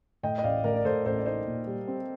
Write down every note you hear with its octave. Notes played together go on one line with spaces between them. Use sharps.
A2 D#5 G5
D#5
A1 D5 F5
A2 A#4 D5
D5
A2 A4 C5
A1 A4 C5
D5
D#4 C5 D#5
A#2
G3
C4